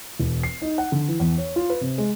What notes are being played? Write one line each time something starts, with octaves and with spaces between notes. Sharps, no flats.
E1
C7
D#4
F#5
D3
E3
E2
C#5
F4
B4
C3
G#3